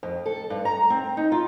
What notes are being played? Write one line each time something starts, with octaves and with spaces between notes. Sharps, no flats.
F2
A4
G2
A#5
C4
D#4
F4